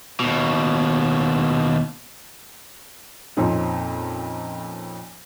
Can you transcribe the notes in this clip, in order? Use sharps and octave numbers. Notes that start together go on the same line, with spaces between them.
D#2 B2
F2 A#2 C4 C#4 D#4